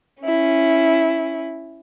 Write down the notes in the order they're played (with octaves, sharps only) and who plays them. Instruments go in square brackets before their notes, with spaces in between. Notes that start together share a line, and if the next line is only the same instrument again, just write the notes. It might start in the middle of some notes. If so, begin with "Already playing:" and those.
[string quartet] C#4 E4